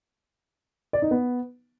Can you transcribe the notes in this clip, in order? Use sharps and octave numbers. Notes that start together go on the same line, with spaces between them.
D5
D#4
B3